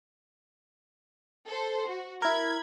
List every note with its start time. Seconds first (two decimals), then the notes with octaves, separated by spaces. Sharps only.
1.48 A4 C5
1.88 F#4
2.22 E4 A#4 B5 G#6